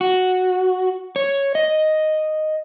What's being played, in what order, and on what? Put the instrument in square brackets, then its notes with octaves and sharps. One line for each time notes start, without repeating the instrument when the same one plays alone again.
[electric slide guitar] F#4
C#5
D#5